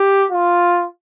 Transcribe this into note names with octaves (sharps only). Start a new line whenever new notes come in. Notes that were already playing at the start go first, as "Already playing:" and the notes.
Already playing: G4
F4